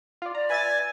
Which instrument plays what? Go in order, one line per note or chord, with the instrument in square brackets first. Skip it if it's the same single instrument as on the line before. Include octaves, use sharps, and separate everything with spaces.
[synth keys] F4 D5
[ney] D5 [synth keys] A#5
[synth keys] B4 E5 A6 [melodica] G#5